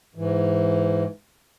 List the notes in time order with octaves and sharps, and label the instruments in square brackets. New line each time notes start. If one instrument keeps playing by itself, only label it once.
[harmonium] G#2 E3